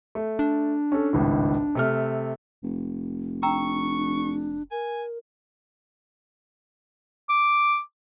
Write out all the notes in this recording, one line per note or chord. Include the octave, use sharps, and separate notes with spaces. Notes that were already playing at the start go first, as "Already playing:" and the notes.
A3
D4
C#4 A4
G#1 C#2 A2
C3 A3 F6
F1
D4 G5 A#5 C#6 E6
A#4 G#5
D6